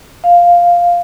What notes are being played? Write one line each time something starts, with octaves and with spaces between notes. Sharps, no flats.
F5